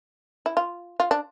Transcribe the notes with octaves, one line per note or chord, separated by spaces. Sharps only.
E4
F4
F4
D4